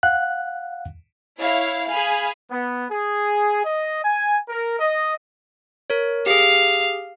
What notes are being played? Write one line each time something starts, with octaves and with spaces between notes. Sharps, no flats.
F5 F#5 F#6
E4 C#5 F5
G#4 F5 G#5 B5
B3
G#4
D#5
G#5
A#4
D#5
A#4 C#5
G4 G#4 F5